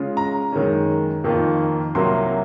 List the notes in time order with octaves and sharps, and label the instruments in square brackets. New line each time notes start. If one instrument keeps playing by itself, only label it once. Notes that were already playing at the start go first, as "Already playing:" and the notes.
Already playing: [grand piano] C#3 G#3 C#4 F4
A#5
F#2 D#3 G#3 C#4
F2 D#3 A#3 F4
C2 C3 F#3 A#3 C6